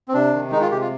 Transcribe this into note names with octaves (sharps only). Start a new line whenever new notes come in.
C4
C3 D4
D#3
G#3 D#4
F4
C3 G4
F4